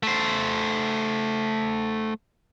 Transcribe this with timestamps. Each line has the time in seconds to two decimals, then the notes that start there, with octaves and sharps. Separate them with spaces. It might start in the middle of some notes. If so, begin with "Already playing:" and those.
0.03 A3 C5